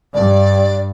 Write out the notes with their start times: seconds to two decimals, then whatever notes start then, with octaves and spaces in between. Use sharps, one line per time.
0.14 G2 D5